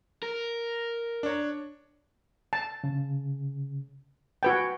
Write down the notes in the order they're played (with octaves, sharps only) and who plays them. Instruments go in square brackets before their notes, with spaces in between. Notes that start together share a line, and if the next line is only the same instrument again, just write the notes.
[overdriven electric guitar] A#4
[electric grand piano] D4 C#5
[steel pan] A5
[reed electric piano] C#3
[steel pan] F#4 B4 G5 [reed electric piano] G#5 G#6